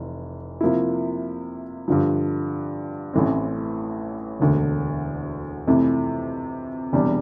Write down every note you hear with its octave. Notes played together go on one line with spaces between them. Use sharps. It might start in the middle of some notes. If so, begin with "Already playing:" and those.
Already playing: F1 E3
C3 F3 A#3 E4
G2 D3 F3
A1 A2 E3 A3 C4
E1 D2 D3
F2 C3 E3 A3
E1 E2 C3 G3 D4